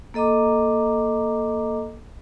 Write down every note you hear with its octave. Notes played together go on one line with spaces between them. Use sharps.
A#3 A4 D#5 A#5 D6